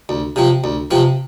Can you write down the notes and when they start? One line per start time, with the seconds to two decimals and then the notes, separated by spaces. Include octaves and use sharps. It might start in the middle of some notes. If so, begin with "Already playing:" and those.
0.09 D2
0.36 C3 F3 C4
0.64 D2
0.91 C3 F3 C4